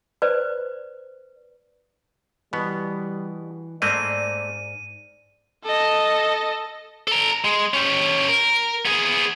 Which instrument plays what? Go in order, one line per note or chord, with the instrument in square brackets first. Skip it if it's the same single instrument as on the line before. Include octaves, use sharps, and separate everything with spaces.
[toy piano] B4 C5 D5
[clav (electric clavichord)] B2 B3 [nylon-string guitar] E3 [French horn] G3
[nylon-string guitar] G#2 [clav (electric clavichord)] A3 A#3 C4 [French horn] D5 [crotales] D#7
[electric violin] A4 D#5
[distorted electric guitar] A4 A#5
G#3
C#4 G4
A#4
B3 G#4